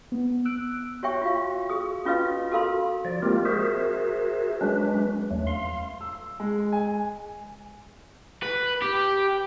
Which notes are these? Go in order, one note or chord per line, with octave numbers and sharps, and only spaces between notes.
B3
E6 F#6 D7
F#4 C#5 E5 G5 C#6
F4 F#4 F5
G#4 D#6
C#4 F4 F#4 B4 D#5 F5
F#4 A4 A#4 F5 B5 C6
F3 D5
G#3 A#3 C4 F4 G4 A#4
F#4 G#4 A#4 C5 E5
F#3 G#3 C#4 D4 B4
E2 F#3 A3
F5 C6
E6
G#3
G#5
B4
G4